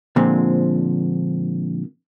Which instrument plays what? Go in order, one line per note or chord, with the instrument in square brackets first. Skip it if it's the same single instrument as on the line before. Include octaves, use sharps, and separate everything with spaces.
[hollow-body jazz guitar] A#2 D3 F3 G#3 C4